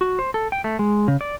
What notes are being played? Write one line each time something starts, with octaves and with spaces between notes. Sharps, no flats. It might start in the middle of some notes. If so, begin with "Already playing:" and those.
F#4
C5
A4
G5
A3
G#3
C#3
D5